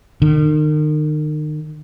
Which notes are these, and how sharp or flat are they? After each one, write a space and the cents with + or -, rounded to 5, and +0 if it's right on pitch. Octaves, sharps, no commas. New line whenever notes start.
D#3 -35